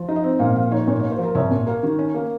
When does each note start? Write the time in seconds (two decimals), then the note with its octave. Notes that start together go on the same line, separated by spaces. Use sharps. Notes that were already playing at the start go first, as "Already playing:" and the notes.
Already playing: F3
0.08 D#4
0.16 D#5
0.24 C4
0.39 A#2 F5
0.55 F3 F5
0.71 D#4 C#5
0.87 A#2 C#5
1.00 A#3 C#5
1.12 C5
1.19 F3
1.24 A#4
1.35 C2 C#5
1.51 A#2
1.66 A#3
1.83 D#3
1.99 C#4
2.14 A#3